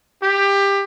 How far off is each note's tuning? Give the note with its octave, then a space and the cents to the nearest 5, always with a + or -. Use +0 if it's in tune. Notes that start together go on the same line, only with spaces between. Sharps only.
G4 +20